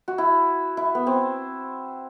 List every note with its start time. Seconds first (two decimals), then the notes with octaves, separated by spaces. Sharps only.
0.08 F#4
0.18 E4
0.77 E4
0.95 B3
1.07 C4